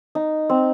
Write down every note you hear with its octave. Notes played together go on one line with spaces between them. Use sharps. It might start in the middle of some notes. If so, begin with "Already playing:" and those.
D#4
C4